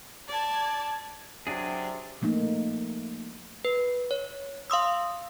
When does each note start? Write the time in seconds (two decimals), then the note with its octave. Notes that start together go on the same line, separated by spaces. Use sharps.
0.28 D5 A5 G#6
1.47 C3 F#3 D4 G#4
2.22 F3 A3 A#3 D#4
3.65 B4
4.11 C#5
4.70 F5 C6 D#6 E6